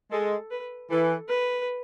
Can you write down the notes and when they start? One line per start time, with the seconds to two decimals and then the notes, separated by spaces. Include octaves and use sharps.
0.12 G#3 A4
0.51 B4
0.90 E3 A4
1.29 B4